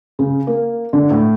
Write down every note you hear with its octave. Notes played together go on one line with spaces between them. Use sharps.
C#3
A#3
D3
A2